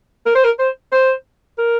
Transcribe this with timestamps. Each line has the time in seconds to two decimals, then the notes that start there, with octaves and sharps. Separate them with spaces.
0.26 A#4
0.35 C5
0.44 A#4
0.59 C5
0.92 C5
1.58 A#4